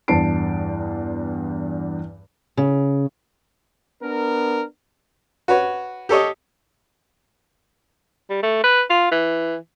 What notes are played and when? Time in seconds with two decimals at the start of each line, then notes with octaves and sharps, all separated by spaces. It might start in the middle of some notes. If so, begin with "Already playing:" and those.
0.08 E2 G2 A5 C7 D7
2.57 C#3
4.02 B3 D4 A#4
5.48 F#4 B4 C#5
6.09 G4 A4 C#5 D#5
8.30 G3
8.43 A3
8.64 B4
8.90 F4
9.12 E3